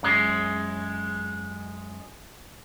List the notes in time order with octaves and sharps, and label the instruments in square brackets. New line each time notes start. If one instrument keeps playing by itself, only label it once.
[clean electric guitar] F#2 G#3